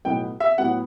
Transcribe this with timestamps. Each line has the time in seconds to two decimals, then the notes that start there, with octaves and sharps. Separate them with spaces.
0.05 B1 A2 F#3 B3 G5
0.40 E5
0.58 A2 F#3 B3 F#5